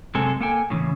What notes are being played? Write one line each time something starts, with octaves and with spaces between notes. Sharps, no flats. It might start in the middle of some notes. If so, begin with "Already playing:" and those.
F#2 C3 G#3 C4 A4 G#5
A#3 A4 G5 G#5
A2 C#3 E3